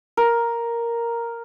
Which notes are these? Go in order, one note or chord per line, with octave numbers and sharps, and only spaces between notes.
A#4